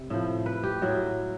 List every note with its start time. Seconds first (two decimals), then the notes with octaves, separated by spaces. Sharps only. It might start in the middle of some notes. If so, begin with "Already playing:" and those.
Already playing: C3
0.10 A2 F3
0.46 B4
0.63 G4
0.82 A2 F#3 F#4